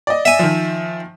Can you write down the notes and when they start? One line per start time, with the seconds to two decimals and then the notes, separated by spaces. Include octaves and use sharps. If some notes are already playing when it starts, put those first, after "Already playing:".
0.07 D5 D#5
0.25 E5 G#5
0.39 D#3 F3